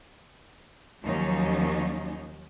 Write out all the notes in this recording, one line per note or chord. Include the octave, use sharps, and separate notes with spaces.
D#2 F3 F#3 C#4 D#4